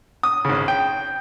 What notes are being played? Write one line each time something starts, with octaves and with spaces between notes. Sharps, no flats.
D#6
G#1 C#3
G5